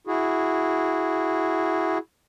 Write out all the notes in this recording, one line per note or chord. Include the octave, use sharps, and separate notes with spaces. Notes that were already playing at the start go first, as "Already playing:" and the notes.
E4 F#4 G#4